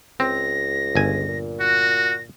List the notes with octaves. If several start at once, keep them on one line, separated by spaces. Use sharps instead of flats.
C#2 C4 A#6
G1 G#5
A#2
F#4 A#6